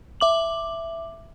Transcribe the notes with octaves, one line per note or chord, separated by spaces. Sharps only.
E5 D6 F#7